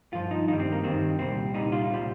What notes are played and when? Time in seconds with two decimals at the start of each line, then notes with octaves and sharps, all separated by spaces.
0.13 G2 F3 F4
0.31 D#4
0.48 G2 D#3 G3 D#4
0.60 C4
0.72 A#3
0.83 G2 D#3 G3 C4
1.18 C2 A#2 G3 C4
1.54 C2 A#2 G3 D#4
1.72 F4
1.89 C2 A#2 G3